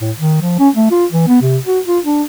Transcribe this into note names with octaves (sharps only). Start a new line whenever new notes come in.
A2
D#3
F3
C#4
A3
F4
E3
B3
C3
F#4
F4
D4